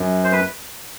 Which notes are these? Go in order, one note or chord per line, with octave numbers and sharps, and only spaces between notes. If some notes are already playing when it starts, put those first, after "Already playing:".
Already playing: F#2
C5
B4